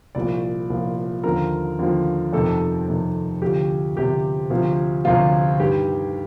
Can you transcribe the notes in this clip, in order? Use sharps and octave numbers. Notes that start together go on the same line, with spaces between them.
C2 A#2 F3 D5
C2 A#2 F3
D#2 D3 F3 A#4
D#2 D3 F3
F2 C3 D#3 A4
F2 C3 D#3
D2 C3 F3 G4
D2 C3 F3 G4
D2 C3 F3
D2 C3 F3 F4
G2 D#3 G4